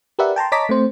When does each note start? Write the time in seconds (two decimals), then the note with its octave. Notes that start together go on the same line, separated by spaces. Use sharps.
0.19 G4 A#4 B4 D5 E5 F#5
0.36 G5 A5 A#5 C6
0.52 C#5 D#5 A5 A#5 D6 B6
0.69 A3 C4 C5